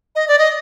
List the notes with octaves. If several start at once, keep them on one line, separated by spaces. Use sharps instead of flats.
D#5
D5
D#5